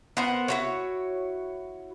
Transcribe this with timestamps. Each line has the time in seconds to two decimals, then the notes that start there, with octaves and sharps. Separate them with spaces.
0.17 B3 A#4 C5 F#5
0.48 E4 F#4 C#5